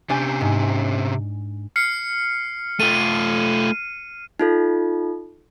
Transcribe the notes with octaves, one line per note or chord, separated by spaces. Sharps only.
C3 C#4 D4 G4 G#5 G6
G#2
F6 C7 C#7
A3 F4 D#7
D#4 F4 A4